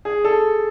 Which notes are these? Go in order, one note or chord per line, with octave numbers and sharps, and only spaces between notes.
G#4
A4